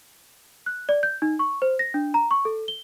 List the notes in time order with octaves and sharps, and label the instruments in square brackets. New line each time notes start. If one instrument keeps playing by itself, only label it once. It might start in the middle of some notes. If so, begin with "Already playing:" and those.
[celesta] F#6
D5
G6
D#4
C#6
C5
A#6
D4
A#5
C#6
A4
G7